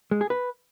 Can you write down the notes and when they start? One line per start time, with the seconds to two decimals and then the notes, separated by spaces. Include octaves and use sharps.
0.11 G#3
0.21 G#4
0.30 B4